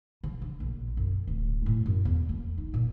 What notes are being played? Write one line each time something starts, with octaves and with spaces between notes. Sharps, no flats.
C#3
D4
A#1
F#2
C4
D1
A2
F#2
E2
A#3
D#4
A#2